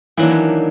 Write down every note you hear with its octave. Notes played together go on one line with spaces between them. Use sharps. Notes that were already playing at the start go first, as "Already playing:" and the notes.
D#3 E3 F#3 A#3 D4